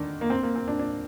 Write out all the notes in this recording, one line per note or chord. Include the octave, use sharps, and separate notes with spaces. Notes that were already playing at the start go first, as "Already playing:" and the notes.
Already playing: D3 D#3 D4
A#3
C4
A#3
C4
D4
D4